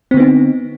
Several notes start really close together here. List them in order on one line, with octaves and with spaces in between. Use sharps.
C4 D3 B3 D#4